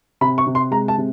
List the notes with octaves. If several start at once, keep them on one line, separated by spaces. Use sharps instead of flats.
C3 B5
C#6
C3
C6
G#3 A#5
A5
C3